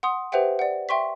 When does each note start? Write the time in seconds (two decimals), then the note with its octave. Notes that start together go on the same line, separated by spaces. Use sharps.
0.03 F#5 C6 D#6
0.32 G4 B4 C5 E5 F#5 G5
0.59 D5 F#5
0.89 E5 G5 C6 C#6 B6